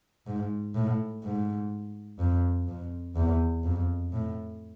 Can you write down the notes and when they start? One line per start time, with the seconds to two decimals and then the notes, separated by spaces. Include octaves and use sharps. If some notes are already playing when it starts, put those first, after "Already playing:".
0.27 G#2
0.75 A2
1.24 G#2
2.19 F2
2.68 F2
3.16 E2
3.64 F2
4.13 A2